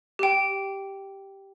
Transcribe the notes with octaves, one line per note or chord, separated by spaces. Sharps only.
G4 G5